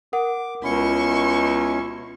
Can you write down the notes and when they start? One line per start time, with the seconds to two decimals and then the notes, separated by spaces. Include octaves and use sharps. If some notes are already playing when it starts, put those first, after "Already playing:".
0.13 A#4 F#5 D6
0.63 C#2 B2 C#4 E4 C6 C#6